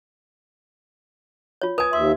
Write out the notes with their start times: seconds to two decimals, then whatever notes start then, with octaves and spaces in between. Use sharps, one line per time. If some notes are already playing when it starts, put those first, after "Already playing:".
1.62 F4 C#5
1.78 B4 G#5 D#6 G#6
1.93 D#2 E5 C6